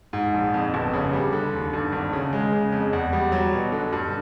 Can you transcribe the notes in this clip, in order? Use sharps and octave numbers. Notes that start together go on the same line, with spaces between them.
G#2
A#1
F2
G1
C#3
G3
D3
D#2
G2
G#1
C#3
G#3
C#3
F2
E2
G3
F#3
B2
D3
G2